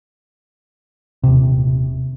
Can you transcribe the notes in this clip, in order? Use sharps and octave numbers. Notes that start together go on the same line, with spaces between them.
D#1 C3